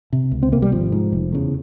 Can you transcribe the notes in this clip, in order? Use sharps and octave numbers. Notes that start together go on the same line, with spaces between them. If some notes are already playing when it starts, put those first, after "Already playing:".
C3
C#2
C4
C3 A#3
G3
G#1 F3
G#2
F1
E2 C#3